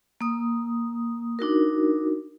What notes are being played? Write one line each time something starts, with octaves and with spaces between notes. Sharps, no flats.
A#3 D#6
D4 D#4 F#4 A#4